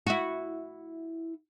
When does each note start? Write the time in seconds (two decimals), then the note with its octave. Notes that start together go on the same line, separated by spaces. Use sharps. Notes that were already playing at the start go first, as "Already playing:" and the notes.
0.07 E4 F#4